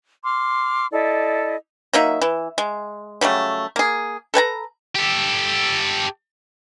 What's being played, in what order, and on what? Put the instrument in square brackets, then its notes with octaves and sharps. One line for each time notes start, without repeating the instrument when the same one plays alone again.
[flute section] C6 D6 F6
E4 A4 D5 D#5
[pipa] F#3 A#3 D#4 E5
E3
G#3
C#3 F#3 G3 A3
A#3 G#4
A4 B4 G#5 A#5
[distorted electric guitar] G4 A4